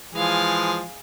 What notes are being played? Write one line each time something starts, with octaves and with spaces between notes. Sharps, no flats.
E3 F3 G#3 G#4 F5